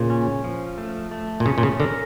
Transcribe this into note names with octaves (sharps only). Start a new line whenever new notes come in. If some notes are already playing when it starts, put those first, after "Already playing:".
Already playing: A#2 C#3
C#4
F3
A3
A3
A#2
C#3 C#4
A#2
C#3
D3 A#4